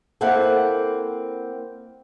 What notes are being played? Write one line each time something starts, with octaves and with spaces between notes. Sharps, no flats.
A#3 C4 E4 A4 F#5